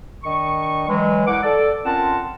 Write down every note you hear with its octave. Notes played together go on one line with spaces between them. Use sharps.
D#3 D4 D#5 C#6
E3 F#3 G#3
C2 F#5 D6
A4 D5
C4 C#4 F4 A#4 F#5 A5